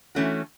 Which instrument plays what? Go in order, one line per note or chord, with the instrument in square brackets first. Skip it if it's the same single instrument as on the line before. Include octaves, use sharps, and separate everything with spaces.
[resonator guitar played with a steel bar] E3 A3 C#4 F#4